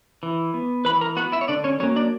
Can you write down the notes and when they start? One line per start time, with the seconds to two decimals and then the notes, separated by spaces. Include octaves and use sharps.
0.23 E3
0.54 B3
0.85 E3 B4 B5
1.01 A#4 A#5
1.17 B3 F#4 F#5
1.32 E4 E5
1.41 C#5
1.48 D3 D4 D5
1.64 C#4 C#5
1.80 F#3 A#3 C#4 C#5
1.96 D4 D5